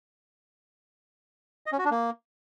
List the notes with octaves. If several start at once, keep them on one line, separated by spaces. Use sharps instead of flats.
D#5
C#4
F#4
D4
A#3